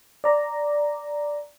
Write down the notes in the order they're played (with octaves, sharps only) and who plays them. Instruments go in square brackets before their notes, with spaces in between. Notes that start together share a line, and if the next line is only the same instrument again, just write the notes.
[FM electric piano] D5 A#5